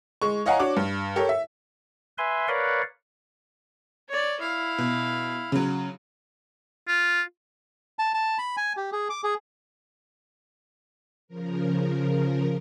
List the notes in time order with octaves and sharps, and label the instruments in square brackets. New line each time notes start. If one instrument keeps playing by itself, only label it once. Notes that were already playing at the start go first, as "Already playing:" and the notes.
[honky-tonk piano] G#3 C#6
C#5 D#5 F5 F#5 G#5 A#5
D4 F#4 C#5 D6
G2
G4 A4 A#4 C#5
E5
[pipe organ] B4 E5 G#5 C6
A#4 B4 C#5 D5 F5 F#5
[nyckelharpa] C#5 D5
E4 F5
[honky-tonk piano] B2
C#3 F#3
[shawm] F4
[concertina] A5
A5
B5
G#5
G4
G#4
D6
G#4
[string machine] C#3 F3 A#4